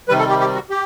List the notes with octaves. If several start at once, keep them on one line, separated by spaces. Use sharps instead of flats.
C3 D#3 G3 B4
A4
G4
G4
F#4
G4